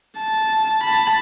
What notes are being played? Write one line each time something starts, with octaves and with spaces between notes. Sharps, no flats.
A5
A5 B5